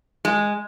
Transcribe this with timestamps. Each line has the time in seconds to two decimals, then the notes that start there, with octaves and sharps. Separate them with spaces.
0.25 G#3